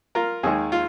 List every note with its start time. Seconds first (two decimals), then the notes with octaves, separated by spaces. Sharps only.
0.15 F4 A#4
0.43 D#2 D#3 G#3 G#4
0.72 F4